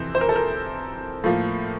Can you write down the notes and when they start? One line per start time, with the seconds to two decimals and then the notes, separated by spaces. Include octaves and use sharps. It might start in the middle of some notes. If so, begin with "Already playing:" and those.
Already playing: F2 C3 E3 C5
0.15 C5
0.21 A#4
0.29 A4
0.36 A#4
1.24 A2 F3 A#3